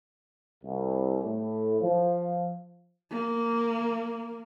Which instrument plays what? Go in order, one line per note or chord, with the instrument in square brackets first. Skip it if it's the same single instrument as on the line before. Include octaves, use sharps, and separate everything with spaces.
[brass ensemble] C2
A2
F3
[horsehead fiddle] A#3